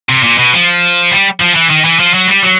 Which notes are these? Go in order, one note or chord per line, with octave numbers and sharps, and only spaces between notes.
C3
A#2
B2
F3
G3
F3
E3
D#3
E3
F3
F#3
G3
F#3